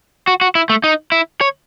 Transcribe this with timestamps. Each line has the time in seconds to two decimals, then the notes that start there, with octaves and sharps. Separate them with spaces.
0.27 F#4
0.41 F#4
0.55 E4
0.69 A3
0.84 D#4
1.12 E4
1.41 C#5